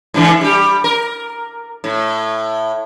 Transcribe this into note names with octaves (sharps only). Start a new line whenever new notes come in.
G#2 D3 E3
G3 G4
A#4
A2